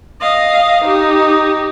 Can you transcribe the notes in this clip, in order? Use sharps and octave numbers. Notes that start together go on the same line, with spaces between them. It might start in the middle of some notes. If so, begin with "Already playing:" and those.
D#5 F5
D#4 G4